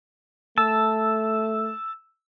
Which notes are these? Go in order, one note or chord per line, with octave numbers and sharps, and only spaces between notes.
A3 A5 E6